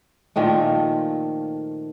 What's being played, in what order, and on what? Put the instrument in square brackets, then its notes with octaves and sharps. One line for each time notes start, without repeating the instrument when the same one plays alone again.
[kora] A#2 D#3 F3 A3